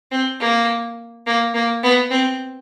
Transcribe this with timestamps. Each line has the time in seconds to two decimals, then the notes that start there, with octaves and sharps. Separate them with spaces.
0.12 C4
0.40 A#3
1.27 A#3
1.54 A#3
1.83 B3
2.11 C4